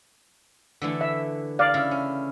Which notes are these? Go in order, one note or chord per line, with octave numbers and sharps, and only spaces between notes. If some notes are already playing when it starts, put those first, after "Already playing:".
D3 E3 A3
E5
D5 F5
C#3 E4
C#4